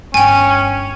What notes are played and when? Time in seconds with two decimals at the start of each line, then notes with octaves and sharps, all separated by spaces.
0.14 G1 C#4 D4 G5 G#5